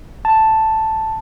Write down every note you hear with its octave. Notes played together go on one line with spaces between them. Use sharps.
A5